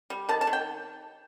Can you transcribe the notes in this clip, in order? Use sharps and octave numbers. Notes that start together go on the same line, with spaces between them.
G3
D#3 A5
A5
D#3
G5